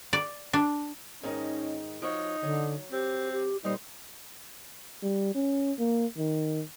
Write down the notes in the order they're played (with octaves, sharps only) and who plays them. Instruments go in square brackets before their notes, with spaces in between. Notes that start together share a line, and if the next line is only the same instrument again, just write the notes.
[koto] D5
D4
[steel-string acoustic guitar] G#2 D#3 D#4 [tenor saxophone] C#4
[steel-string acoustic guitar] F3 F#4 C#5 [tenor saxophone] D#4
[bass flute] D3 [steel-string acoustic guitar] F#3
[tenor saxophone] C4 [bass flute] G4
[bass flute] G4
[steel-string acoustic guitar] A#2 C5 [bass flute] G3 [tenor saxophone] D#4
[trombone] G3
C#4
A#3
D#3